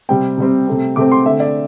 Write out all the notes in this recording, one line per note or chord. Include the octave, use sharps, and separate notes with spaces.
C3 G3 C4 G5
C3 G3 C4
C3 A3 C4
C3 A3 C4 D6
C6
D3 A3 C4 E5
D5